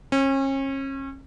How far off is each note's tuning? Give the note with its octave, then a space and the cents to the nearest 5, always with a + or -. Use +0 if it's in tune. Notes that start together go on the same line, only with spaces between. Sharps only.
C#4 -35